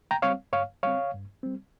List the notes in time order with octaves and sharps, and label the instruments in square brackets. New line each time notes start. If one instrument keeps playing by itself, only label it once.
[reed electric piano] G5 A#5
G3 C4 C#5 F5
G2 C#5 F5
G3 C4 C#5 F5
G2
G3 C4